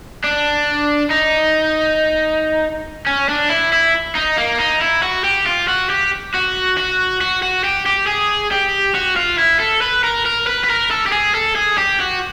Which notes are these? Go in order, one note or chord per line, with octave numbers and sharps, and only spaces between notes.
D4
D#4
C#4
D4
E4
E4
D#4
A#3
D#4
E4
F#4
G4
F4
F#4
G4
F#4
F#4
F#4
F#4
G4
G4
G#4
G4
F#4
F4
E4
A4
B4
A#4
A#4
B4
B4
A#4
A4
G4
G#4
A4
G#4
G4
F#4